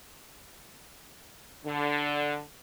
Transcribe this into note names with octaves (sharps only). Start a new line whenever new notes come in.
D3